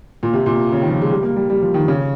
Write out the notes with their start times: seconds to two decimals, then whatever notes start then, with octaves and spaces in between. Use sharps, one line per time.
0.23 A#2
0.33 C3
0.46 A#2
0.72 C#3
0.82 D#3
0.91 F3
1.02 G#3
1.11 G3
1.23 A#3
1.36 G3
1.50 G3
1.62 F3
1.74 D#3
1.88 C#3